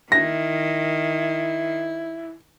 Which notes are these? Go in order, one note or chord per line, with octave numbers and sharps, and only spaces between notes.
D#3 E4 A#6